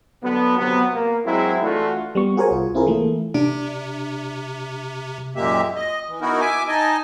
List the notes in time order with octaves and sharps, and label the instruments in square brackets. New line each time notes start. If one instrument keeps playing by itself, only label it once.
[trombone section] D3 F#3 B3
C3 F#3 B3
A#3
F#3 G#3 C4 E4
E3 A3 D4 F4 F#4
[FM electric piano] G3 B3 C#6
F#4 G#4 A#4 C5 C#5 G#5
C2 F4
C4 E4 F4 G#4 A#4
E3 A3 A#3
[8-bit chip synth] C3 [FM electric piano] D4
[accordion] F#2 A#2 G#3 A#3 G4 E5
D#5
E3
B3 D#4 E4 F#4 A#4
E5 G#5 D6
D#4 D#5 G#5 A5